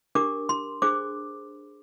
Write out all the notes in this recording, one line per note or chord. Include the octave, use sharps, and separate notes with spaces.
D4 G4 A#4 D6
C6
D4 G#4 C5 D6